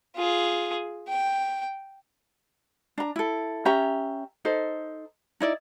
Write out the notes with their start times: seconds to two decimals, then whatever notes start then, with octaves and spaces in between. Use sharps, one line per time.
0.16 F4 G#4
1.08 G5
2.98 D4 A#5
3.16 E4 A4
3.65 C#4 G4 E5 A#5
4.45 D#4 A4 C5
5.40 D#4 E4 D5